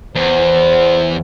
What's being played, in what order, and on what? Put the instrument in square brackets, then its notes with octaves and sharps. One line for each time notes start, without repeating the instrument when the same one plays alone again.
[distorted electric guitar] E2 [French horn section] C5